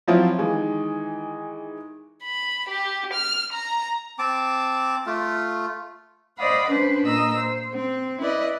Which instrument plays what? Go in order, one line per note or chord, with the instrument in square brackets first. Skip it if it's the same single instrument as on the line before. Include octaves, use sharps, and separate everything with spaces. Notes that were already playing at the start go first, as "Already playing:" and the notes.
[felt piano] F3 F#3 C4 E4 F4
D#3 E3 G#3
[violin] B5
G4
F6
A#5
[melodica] C4 A5 D6
A3 F4
[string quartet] C5 D5 D#5 F5 F#5 B5
C#4 D4 B4 C5
A#2 D#5 A#5 E6
C5
C4
E4 B4 D5 D#5